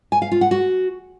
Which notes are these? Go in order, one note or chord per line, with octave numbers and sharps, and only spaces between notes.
G#5
F5
F4
F#5
F#4